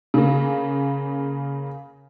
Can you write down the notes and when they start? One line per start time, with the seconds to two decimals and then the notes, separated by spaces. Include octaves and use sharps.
0.14 C#3 A#3